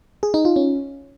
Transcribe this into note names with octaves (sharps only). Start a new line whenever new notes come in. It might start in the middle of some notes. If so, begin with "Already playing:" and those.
G#4
D#4
F4
C#4